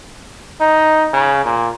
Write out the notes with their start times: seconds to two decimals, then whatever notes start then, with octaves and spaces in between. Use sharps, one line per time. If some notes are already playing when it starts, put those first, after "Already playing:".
0.60 D#4
1.13 C#3
1.45 A#2